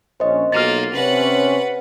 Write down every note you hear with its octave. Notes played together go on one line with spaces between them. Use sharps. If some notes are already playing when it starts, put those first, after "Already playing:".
A#1 C#4 C5 D#5
B1 A#3 F4 F6 A6
C3 C#4 B4 F#5